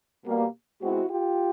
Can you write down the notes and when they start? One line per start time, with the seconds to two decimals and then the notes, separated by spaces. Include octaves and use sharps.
0.25 B2 G3 A#3
0.81 B2 G#3 C4 E4 F#4
1.09 F4 G4